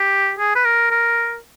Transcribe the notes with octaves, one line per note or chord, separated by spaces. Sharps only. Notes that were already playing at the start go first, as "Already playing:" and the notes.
Already playing: G4
G#4
B4
A#4
A#4